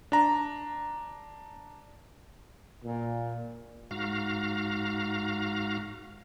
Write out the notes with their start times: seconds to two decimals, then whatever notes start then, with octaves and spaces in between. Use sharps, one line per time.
0.12 D4 A#5
2.84 A#2
3.91 G#2 F#4 F5 A#5